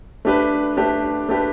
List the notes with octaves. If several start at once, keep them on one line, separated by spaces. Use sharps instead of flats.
A3 D4 G4 B4
A3 D4 G4 B4
A3 D4 G4 B4